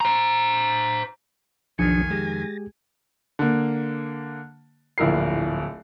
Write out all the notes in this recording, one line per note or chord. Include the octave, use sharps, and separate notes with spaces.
C5 A#5
B1 F2 D#3 F3 D4 G4 G#5 C#7
G#3 G4 G#4 A6 A#6
D3 A#3
D1 A#1 E4 A#4 C7